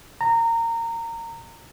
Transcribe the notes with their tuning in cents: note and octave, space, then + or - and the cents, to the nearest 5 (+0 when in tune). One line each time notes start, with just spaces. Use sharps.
A#5 -20